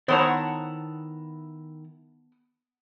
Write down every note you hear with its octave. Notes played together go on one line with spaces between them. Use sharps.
D#3 B3 E4 C5 C#5 F#5 A5 A#5